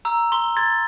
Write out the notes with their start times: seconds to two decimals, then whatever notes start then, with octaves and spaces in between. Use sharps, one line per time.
0.05 A#5 E6
0.32 C6 G7
0.57 C6 G#6 A6